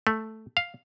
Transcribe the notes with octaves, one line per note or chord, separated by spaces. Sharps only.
A3
F5